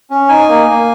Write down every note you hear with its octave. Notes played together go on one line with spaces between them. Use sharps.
C#4
D#4 G#5
A#3
A#3